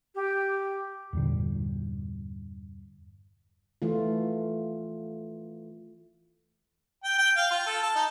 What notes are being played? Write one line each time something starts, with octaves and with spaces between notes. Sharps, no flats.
G4
E2 G2 A#2 D3
E3 A3 F4
G5
G5
F5
F4
A4
A5
D#4